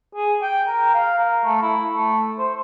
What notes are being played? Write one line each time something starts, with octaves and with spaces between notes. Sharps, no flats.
G#4
G5
A#4
F5
A#4
A3
E4
A3
C5